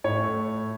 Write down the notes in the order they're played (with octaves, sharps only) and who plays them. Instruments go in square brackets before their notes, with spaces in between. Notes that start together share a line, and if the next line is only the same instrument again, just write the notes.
[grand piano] A2 C#5
A3